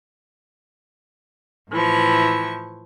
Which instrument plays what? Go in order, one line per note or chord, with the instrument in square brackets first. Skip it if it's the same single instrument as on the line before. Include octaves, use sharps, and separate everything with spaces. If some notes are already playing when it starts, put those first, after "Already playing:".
[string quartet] A2 E3 F3 C#6